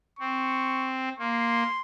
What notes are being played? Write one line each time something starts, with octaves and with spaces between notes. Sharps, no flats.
C4 C#6
A#3 C6